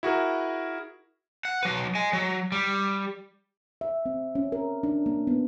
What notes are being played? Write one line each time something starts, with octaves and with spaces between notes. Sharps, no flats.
E4 F#4 G#4 A#4
F#5
F#3 B4
D#5 G#5
F#3
G3
E5
C4
C#4
A#4
D4
A#3
B3